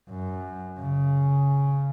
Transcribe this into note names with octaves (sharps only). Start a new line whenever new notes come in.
F#2
C#3